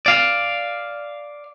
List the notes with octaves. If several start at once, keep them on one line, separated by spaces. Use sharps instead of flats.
D5 F5